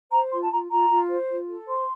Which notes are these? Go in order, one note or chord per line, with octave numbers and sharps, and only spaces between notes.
C5 A#5
F4 C6
A5
F4 A#5
F4 A#5
F4
C5
F4
A4
C5 C6